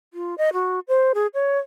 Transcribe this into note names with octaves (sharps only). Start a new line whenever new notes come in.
F4
D#5
F#4
C5
G#4
C#5